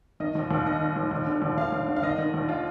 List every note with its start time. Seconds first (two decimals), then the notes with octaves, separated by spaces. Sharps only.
0.20 D#3 D#5
0.35 D#2
0.51 D#2
0.65 D#3 D#5
0.81 D#3
0.96 D#2
1.11 D#2
1.27 D3
1.42 D#2
1.57 D#2 F5
1.72 D#2
1.88 D3
1.96 F5
2.03 D#3 D#5
2.18 D#3
2.34 D#2
2.49 F4